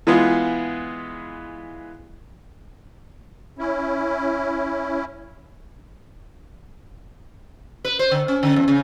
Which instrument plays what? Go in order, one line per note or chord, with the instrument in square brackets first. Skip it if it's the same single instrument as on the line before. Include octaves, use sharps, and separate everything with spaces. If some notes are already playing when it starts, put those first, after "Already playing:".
[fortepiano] E3 G#3 B3 F4 G#4
[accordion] C#4 E4
[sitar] B4
C5
D3
C#4
D3
E2
C#3